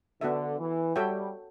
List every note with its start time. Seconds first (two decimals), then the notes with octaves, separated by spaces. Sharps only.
0.21 D3 B3 F#4 A4 E5
0.59 E3
0.96 G3 F#4 A4 C#5 E5 G5